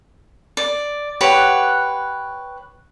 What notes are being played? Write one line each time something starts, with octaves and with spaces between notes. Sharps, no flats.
D5
G4 B4 C#5 F#5